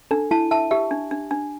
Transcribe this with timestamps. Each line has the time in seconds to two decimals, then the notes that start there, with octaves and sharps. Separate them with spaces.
0.11 D4 A4
0.31 E4 A5
0.51 E5 A5
0.71 G4 E5
0.91 D4
1.11 D4
1.31 D4